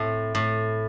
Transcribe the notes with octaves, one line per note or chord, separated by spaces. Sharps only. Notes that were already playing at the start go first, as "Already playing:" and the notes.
Already playing: A2 A3 C4
A2